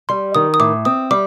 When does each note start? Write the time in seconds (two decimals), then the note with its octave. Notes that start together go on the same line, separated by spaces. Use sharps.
0.09 G3 C6
0.35 D#3 D#6
0.54 D#6
0.60 A2 D6
0.85 C4 D#6
1.11 G3 D6